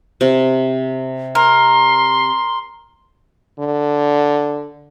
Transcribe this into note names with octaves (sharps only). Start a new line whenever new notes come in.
C3
A#4 C6
D3